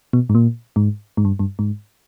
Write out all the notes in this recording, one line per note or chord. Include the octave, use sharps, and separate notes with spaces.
B2
G#2
A#2
G#2
G#2
G2
G2
G#2